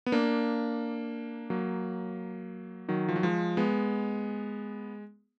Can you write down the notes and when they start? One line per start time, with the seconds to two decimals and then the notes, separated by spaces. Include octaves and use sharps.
0.06 B3
0.12 A#3 D4
1.50 F#3 A#3
2.88 D#3 F#3
3.08 F3
3.16 F#3
3.23 F3 G#3
3.57 G#3 B3